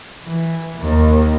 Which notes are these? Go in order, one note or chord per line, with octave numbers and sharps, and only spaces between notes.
E3
D#2